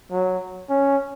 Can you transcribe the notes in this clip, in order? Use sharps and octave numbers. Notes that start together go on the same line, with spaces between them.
F#3
C#4